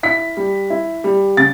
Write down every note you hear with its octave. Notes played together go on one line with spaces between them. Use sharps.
E4 B6
G3
E4
G3
C#3 A6